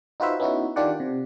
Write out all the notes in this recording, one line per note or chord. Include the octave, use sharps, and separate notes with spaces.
D#4 F4 F#4 B4 C5 E5
B3 C#4 D#4 E4 F#4
D#3 D4 F4 G4 D5 F#5
C3